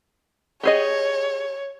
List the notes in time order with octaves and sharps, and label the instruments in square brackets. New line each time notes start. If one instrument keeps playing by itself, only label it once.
[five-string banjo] G4 G#4 D#5 [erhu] C#5